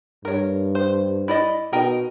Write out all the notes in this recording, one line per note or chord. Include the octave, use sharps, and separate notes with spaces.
G2 A#4 C#5
C5
E4 D5 D#5
B2 D#4 A#4 G5